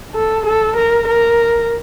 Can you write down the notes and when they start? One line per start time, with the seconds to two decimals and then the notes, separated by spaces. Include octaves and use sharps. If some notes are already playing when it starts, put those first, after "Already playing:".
0.15 A4
0.46 A4
0.77 A#4
1.08 A#4